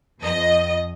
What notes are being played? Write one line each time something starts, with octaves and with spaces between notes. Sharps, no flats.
F2 D#5